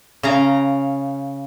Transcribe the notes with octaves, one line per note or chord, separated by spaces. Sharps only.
C#3 F5 A#5